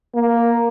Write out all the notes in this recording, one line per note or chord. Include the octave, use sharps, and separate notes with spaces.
A#3